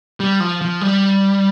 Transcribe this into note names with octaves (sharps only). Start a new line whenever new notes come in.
G3
F3
F3
G3